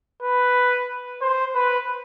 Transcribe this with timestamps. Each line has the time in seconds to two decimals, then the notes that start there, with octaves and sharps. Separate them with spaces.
0.22 B4
1.22 C5
1.55 B4